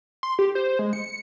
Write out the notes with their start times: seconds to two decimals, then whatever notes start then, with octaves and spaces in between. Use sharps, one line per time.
0.23 C6
0.39 G4
0.55 C5
0.79 G#3
0.93 C#7